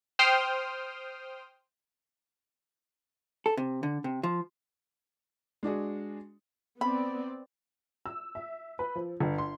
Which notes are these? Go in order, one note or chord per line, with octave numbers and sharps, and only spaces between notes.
C5 G5 C6 D#6 F6
A4
C3
D3
C3
F3
G#3 D4 F#4 G#4
B3 C4 D5 B5
E6
E5
B4
F3
G1
C6